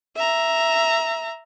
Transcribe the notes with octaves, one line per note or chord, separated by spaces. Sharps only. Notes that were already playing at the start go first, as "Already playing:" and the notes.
E5 A#5